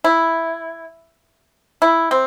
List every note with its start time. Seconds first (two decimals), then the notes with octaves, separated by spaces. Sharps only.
0.04 E4
1.82 E4
2.11 C4